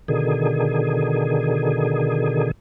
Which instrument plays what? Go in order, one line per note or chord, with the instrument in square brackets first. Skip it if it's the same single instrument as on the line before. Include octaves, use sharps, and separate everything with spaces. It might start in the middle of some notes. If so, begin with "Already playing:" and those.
[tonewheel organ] B2 D3 D#3 G#4